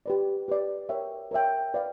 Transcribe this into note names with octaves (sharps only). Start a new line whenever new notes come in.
G4 B4 D5
G4 B4 D5
A#4 C#5 E5 G5
A#4 C#5 E5 G5
B4 D5 F5